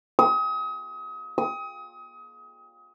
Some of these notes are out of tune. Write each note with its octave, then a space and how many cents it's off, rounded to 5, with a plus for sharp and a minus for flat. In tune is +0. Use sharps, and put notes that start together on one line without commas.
D#6 +35
D#6 +30